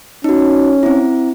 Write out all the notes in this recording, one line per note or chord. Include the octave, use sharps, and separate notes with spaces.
C#4 D#4 F#4
C4 E4